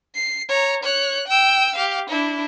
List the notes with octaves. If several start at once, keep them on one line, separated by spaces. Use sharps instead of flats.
C7
C#5 A#5
C#5 F#6
G5 E6
G4 F5
D4 E4